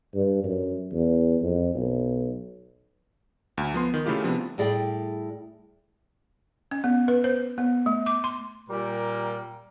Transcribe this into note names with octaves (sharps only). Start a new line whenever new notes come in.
G2
F#2
E2
F2
B1
D2
F3 B3 C6
D#3
C#3 A3 E4 F4 G4
C3 F3 B3 D4
A2 G3 G#4 D5 G5
C#4
B3
B4
C5
B3
A3
D6
C6
A#2 G3 A#4